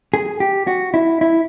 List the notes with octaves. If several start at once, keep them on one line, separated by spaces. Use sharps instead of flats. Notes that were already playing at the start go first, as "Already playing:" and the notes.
G#4
G4
F#4
E4
E4